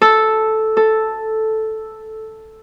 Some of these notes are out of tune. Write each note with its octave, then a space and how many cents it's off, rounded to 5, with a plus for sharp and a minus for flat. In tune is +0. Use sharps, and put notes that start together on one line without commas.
A4 -5
A4 +0